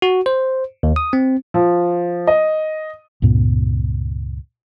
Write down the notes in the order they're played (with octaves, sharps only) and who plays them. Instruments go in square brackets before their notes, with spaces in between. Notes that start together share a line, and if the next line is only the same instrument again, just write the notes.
[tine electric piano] F#4
C5
D#2
D#6
C4
[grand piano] F3
D#5
[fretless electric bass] C#2 G2 A#2 B3